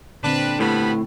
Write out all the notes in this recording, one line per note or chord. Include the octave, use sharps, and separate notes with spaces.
A#2 D3 C4 D4 B4
A2 G3 B3 B5